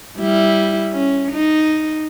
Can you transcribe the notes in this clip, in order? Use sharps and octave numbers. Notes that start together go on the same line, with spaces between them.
G3 E4
C#4
D#4